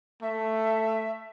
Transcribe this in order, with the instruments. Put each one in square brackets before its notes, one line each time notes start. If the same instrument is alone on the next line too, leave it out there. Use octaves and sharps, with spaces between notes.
[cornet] A3 [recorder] E5